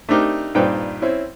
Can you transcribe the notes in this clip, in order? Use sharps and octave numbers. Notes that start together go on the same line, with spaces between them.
A3 C4 D4 D#4 G4 A#4
G2 A#2 C4 D#4 B4 G5
C4 C#4 E4